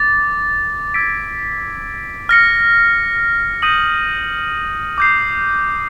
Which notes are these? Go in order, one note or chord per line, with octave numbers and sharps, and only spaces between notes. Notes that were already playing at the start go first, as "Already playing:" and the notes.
Already playing: D6 A6
E6 G#6 B6 D7
F6 A#6 C#7
D#6 G6 A#6 D#7 F#7
D6 G6 C7